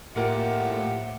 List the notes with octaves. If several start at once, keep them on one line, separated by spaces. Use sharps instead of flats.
A2 F3 A#3 F4 G4 A#4 E5 F#5